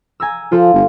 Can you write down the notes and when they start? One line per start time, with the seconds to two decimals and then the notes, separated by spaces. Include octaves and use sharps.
0.20 G#5 A#5 E6
0.52 F3 F4 A4 C5
0.74 G1